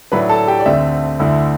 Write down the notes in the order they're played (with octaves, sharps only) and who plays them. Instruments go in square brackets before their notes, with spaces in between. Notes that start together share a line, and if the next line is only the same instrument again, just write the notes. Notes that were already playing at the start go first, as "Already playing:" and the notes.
[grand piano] A2 F#3 A3 D4 B4 B5
A4 A5
G4 G5
D5
D2 D3 A3 C4 E5
D2 D3 A3 E4